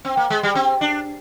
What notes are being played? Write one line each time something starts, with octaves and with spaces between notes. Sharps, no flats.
C4
A#3
G#3
G3
C4
D4